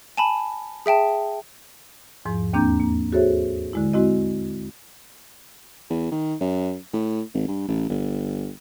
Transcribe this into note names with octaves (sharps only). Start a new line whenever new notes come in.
G#5 A5 B5
G#4 E5 G5 A5
E2 G#2 F3
D#2 A#3 C4 D4 A#5 G6
A#3
F#4 G#4 A4 C5 C#5 E5
D3 G#3 E4
G#3 C4 E4 F#4 D#5
E2
D#3
F#2
A2
G#1
G2
A1
G1